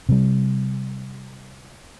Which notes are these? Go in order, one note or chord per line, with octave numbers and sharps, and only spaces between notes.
C3 G3